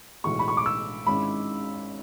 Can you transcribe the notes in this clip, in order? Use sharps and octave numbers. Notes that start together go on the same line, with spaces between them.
B1 A2 E3 G#3 C#6
B5
C#6
D6
E6
G#1 G#2 G#3 C#4 E4 B5